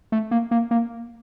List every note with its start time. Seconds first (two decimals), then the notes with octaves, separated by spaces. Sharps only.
0.12 A3
0.31 A#3
0.51 A#3
0.71 A#3